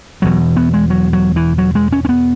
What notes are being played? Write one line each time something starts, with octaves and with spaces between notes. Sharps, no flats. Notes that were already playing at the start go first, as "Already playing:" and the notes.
E1 E2 B2 F#3
B3
G#3
F#3
F#3
E3
F#3
G#3
C#4
C#4
B3